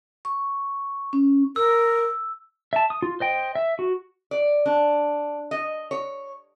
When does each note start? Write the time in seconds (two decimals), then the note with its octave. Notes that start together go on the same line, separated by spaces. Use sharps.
0.25 C#6
1.13 C#4
1.56 A#4 E6
2.73 E5 A5
2.90 D#6
3.02 F4
3.20 C5 D#5 G5
3.55 E5
3.79 F#4
4.31 D5
4.66 D4
5.51 D#5
5.91 C#5